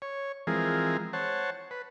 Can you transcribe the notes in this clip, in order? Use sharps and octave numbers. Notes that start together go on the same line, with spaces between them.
C#5
E3 F3 G#3 C4 G#4 A#4
C5 C#5 F#5 A5
B4